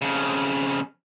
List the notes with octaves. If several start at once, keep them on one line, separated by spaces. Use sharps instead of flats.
F2 C#3